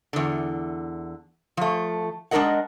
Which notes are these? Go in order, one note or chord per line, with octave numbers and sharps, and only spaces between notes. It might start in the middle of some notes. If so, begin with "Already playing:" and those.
E2 D3
F3 A3
G#3 D4 E4 A#4 D#5 F#5